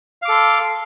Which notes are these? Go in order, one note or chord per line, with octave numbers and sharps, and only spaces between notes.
A4 F5 C6 D6